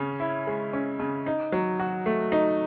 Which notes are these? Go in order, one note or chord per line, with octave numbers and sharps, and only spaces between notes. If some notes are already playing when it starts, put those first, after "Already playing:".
Already playing: C#3 C#4
E4
G#3
C#4
C#3
D#4
F#3
F#4
A3
D#4